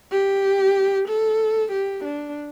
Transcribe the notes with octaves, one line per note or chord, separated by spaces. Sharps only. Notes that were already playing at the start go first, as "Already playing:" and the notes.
G4
A4
G4
D4